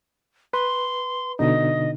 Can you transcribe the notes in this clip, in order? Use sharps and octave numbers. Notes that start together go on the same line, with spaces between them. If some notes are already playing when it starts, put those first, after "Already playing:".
B4 C6
B2 D3 D#4 D#5